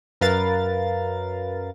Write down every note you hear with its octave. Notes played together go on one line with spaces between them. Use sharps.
F#2 A#4 B4 F5 A6